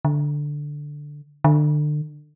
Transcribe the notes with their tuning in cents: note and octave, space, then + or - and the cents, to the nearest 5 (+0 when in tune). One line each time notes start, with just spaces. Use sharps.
D3 +0
D3 +30